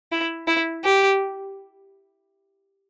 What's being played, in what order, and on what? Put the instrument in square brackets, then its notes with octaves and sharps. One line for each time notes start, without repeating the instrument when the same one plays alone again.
[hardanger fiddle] E4
E4
G4